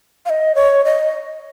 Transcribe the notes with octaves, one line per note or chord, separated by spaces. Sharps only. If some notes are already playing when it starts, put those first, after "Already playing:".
F5
D#5
C#5
D#5